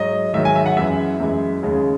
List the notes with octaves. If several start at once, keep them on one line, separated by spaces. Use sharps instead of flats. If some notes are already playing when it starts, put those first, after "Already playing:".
Already playing: G#2 F#3 D#5
G#2 D#3 F#3 E5
G#5
E5
F#5
F#2 E3 G#3 E5
F#2 E3 G#3
D#2 C#3 G#3